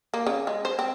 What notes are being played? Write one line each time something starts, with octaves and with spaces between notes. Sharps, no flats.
A#3
C#3
G#3
C5
C4